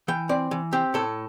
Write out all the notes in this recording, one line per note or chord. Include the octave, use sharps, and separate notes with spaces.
E3 G5
C4 D5
E3
C4 G4
A2 A4